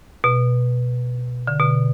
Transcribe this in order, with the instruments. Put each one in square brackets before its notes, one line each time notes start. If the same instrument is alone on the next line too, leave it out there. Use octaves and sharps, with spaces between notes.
[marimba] B2
D3
B2